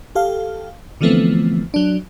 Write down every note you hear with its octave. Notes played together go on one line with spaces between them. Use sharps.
G4 A4 F5
D3 E3 F3 A3 B3 C4
F#3 D4